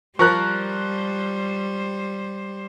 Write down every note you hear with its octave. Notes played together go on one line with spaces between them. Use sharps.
F3 G3 A#4 C5 C#6 F#6